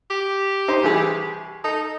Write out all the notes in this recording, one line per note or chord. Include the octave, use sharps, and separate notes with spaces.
G4
D#4 C5
C2 E3 G#4
D#4 A4